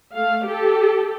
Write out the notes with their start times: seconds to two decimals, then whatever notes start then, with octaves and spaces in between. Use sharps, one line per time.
0.14 A3 F5
0.46 G4 A4